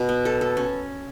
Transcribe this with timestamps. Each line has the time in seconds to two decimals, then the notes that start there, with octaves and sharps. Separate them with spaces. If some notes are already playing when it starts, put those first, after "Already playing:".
Already playing: B2
0.09 B3
0.25 A4
0.41 A4
0.57 C#4